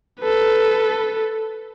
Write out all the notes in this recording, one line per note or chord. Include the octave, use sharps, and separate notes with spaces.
A4 B4